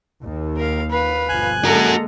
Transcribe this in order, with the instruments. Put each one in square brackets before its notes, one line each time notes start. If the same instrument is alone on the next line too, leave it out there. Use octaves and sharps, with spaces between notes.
[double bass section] D#2
[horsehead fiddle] A#4 F5
B4 F5
[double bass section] G1 B2 F3 [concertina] G#5 F#6
[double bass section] D3 G#3 A#3 [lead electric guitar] F#4 A#4 [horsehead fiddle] A4 A#5